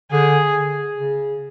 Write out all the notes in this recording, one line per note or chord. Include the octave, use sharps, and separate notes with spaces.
D3 G#4
C#3